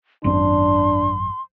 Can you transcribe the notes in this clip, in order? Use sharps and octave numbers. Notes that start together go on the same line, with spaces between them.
G#1 F#2 C4 D4 C6